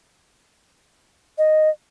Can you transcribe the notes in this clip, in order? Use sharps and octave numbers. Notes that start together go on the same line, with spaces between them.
D#5